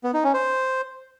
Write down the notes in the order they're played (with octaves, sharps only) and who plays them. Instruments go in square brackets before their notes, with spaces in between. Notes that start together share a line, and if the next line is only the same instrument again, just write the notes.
[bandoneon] B3
D#4
C#4
C5